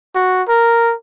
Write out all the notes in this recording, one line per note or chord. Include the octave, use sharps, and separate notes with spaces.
F#4
A#4